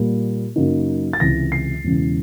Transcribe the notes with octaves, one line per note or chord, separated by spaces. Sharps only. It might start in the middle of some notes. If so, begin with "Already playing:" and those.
Already playing: A#2 G3 A#3
F#2 C#3 F#3 A#3 D#4
A6
C#2 C3 E3 A#6
C7
E1 E2 C#3